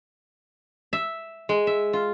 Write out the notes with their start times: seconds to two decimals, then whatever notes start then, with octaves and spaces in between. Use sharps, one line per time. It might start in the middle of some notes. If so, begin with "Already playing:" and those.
0.93 E5
1.49 G#3
1.67 E5
1.93 F4